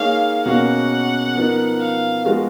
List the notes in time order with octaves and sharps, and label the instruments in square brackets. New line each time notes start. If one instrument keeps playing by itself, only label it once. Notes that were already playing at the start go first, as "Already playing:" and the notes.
Already playing: [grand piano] A#3 D#4 G#4 C#5 [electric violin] F5
[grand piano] B2 A#3 C#4 F#4 A#4 [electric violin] F#5
[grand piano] F3 B3 D#4 A#4
[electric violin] F5
[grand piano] F3 G#3 B3 F#4